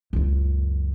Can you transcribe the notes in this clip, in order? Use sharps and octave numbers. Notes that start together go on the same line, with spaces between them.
C#2 F#2